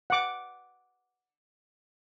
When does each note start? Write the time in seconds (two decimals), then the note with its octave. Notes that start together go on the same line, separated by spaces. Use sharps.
0.10 F#5 D6